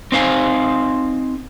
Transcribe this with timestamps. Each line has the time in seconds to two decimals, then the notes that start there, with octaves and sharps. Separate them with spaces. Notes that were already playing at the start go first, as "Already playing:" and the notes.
0.12 C4 D#4 C5 F5 G#5